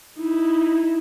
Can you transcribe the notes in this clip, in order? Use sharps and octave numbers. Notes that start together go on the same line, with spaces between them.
D#4 E4